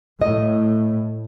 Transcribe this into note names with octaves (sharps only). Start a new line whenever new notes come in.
A2 D#5